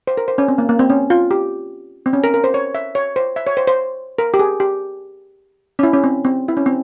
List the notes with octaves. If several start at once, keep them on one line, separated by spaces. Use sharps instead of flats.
C5
A#4
C5
C#4
C4
A#3
A#3
C4
C#4
F4
G4
C4
C#4
A#4
A#4
C5
C#5
E5
C#5
C5
E5
C#5
C5
C5
A#4
G4
G#4
G4
C#4
E4
C#4
C4
C4
E4
C#4
C4